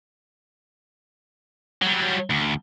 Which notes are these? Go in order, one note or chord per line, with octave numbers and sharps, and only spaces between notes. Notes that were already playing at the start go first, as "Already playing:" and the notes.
F#3 G3
D2